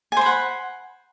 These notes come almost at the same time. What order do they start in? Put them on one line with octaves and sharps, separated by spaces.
G#5 C5 B5 F#5